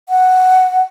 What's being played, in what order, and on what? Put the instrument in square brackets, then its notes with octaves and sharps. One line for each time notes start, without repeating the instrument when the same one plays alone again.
[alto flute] F#5